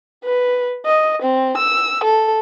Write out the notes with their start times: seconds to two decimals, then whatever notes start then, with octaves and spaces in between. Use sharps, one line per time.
0.24 B4
0.86 D#5
1.22 C4
1.57 E6
2.04 A4